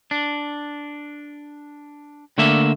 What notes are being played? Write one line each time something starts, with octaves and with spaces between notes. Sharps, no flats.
D4
D3 A3 A#3 E5